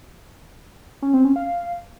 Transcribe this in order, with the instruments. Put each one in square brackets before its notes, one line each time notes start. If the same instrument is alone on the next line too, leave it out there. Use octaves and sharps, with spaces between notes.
[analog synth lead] C#4
C4
C#4
F5